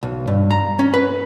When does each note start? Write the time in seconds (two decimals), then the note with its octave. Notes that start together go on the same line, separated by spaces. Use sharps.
0.03 B1
0.27 G2
0.51 A#5
0.79 C#4
0.94 B4